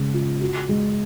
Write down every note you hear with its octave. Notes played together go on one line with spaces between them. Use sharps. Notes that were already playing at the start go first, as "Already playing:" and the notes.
Already playing: C#3 G#3
F4
F#4
G#3